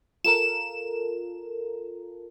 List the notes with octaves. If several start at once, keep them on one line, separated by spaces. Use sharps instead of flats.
F4 A4 A#4 E7